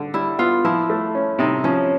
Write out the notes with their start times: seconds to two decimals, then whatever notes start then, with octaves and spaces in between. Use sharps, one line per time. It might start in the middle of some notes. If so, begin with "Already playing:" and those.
Already playing: D3
0.14 G3 E4
0.39 B3 F4
0.65 F3 E4
0.90 A3
1.15 C#4
1.39 C3 D#4
1.64 F3 C#4